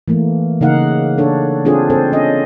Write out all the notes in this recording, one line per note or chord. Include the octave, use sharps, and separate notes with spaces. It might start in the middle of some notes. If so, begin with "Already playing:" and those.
E3 A3 A#3
C#3 A#3 D#4 F5 F#5
D4 A4 C#5
C4 D4 F4 G#4 A4 C5
C4 A4 C5
C#4 D#5